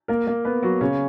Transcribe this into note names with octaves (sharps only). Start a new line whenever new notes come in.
A#3 A#4
A#3 A#4
B3 B4
F#3 F#4
C#3 C#4